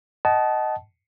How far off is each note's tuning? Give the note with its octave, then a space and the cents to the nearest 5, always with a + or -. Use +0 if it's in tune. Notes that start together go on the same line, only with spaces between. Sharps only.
D#5 +0 F#5 +35 A5 -20